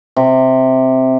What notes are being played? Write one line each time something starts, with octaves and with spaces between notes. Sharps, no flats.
C3